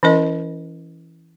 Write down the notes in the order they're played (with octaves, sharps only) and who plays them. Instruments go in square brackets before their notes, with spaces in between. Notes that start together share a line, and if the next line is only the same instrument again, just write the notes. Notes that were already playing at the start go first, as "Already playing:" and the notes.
[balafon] E3 C#4 E4 A#4 D#5